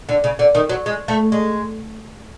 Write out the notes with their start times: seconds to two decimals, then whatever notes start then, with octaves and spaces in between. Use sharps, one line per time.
0.09 D3
0.24 C#3
0.39 D3
0.55 D#3
0.69 F#3
0.86 G#3
1.08 A3
1.32 G#3